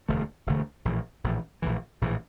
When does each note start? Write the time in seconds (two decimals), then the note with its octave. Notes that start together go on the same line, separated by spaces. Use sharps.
0.08 E1 D2 D3 A3
0.47 E1 D2 D3 A3
0.85 A#1 A2 E3
1.24 A#1 A2 E3
1.62 A#1 A2 E3
2.01 A#1 A2 E3